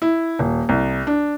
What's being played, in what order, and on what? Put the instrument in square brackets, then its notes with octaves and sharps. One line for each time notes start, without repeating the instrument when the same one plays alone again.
[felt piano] E4
D#1
C2
D4